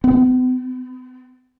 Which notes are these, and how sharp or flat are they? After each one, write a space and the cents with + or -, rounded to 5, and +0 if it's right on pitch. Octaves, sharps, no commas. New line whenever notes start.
B3 +45